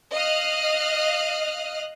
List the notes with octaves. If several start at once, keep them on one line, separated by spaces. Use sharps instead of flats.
D#5 F5 D#6 F6 F#6